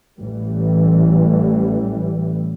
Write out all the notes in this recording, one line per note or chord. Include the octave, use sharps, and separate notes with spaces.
A1 E3 G3